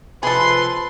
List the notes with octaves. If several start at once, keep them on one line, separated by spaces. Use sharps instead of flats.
C3 F3 G#4 A4 B4 C6